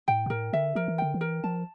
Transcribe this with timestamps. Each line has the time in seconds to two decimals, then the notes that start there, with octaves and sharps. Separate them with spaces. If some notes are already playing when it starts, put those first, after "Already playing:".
0.08 A2 G5
0.26 A#2
0.30 A2 A#4
0.53 D3 E5
0.75 F3 A#4
0.88 E3
0.98 D3 G5
1.14 E3
1.21 A#4
1.44 F3 A5